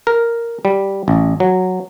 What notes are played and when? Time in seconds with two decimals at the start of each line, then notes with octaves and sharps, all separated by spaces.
0.07 A#4
0.65 G3
1.08 A1
1.40 F#3